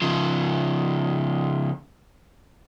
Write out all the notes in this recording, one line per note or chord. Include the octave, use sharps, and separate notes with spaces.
C#3 F3